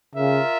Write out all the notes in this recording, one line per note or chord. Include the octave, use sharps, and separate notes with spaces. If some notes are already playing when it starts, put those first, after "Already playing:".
C#3 F4 A#4 E5